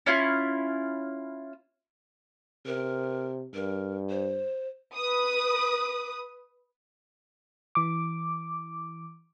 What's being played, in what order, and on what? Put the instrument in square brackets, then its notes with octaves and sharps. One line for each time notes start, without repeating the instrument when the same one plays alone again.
[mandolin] C#4 E4 F4
[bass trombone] C3 [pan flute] A#4
[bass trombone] G2 [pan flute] A#4
[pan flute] C5
[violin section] B4 D#6
[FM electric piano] E3 D6